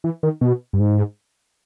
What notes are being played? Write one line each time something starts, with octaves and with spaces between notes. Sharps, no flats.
E3
D#3
B2
G2
G#2